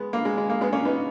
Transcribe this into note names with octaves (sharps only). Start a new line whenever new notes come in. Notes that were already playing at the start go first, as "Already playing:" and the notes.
Already playing: G#3 B3
A#3
G#3
G#3
A#3
G#3 B3
A#3 C#4
B3 D#4